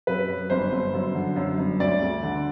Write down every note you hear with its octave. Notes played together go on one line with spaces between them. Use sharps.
F#2 B4
F#2
G1 C5
G1
F#2
D3
F#2
G1
D2 D5
D2
D3